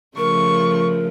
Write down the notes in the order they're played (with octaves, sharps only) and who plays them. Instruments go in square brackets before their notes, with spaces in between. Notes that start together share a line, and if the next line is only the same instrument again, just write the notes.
[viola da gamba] C#3 F3 A3 [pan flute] A#4 [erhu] C#6